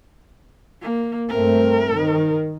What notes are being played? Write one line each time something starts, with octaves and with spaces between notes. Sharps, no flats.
A#3
G2 A3 C4 A#4
D#3